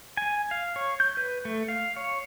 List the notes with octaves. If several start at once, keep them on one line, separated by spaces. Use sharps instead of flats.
G#5
F5
C#5
G6
B4
A3
F5
C#5